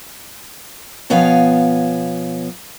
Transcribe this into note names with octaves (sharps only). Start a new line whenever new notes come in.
B2 F3 B3 C#5 F5 G#5